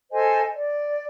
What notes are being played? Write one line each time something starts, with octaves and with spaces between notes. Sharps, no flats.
A4 C5 D#5 G#5
D5